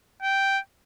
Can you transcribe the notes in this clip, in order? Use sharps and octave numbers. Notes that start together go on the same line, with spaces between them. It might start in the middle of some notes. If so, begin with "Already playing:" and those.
G5